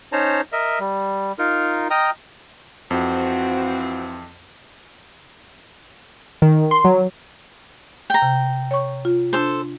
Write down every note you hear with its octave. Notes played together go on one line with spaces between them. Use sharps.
C#4 D#4 C5 C#5 A5 A#5
A#4 D#5 E5
G3
D#4 F4 A#4
D#5 G5 A#5 D#6 F6
F2 E3 F3 C4 F#4
D#3
C6
F#3
G5 A#5
C3
C#5 C#6
F4
D4 A4 C5 C6